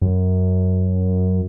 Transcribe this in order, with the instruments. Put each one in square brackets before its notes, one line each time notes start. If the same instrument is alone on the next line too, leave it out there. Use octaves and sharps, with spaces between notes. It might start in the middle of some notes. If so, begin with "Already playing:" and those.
[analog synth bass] F#2